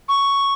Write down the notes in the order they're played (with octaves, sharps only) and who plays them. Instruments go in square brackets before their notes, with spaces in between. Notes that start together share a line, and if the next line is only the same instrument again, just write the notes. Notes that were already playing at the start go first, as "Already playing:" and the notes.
[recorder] C#6